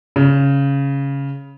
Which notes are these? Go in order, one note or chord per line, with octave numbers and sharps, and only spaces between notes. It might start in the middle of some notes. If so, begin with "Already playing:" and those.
C#3